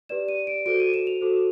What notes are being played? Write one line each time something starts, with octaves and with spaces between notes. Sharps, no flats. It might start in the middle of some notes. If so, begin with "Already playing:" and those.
G4 B4 D5 E7
D#7
D7
F#4 A4 C5 D7
D#7
E7
F7
F#4 A4 C5